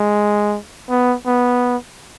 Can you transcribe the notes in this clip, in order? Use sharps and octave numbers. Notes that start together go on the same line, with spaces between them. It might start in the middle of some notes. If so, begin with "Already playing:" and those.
Already playing: G#3
B3
B3